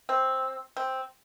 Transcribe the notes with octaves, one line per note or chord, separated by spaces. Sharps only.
C4
C4